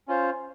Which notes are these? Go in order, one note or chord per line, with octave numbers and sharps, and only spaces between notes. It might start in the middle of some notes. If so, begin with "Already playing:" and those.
C#4 F4 C5